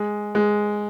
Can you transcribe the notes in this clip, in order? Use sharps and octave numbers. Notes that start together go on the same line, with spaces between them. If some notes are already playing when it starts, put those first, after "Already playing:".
Already playing: G#3
G#3